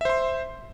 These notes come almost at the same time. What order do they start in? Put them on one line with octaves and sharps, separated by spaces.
E5 C5 C6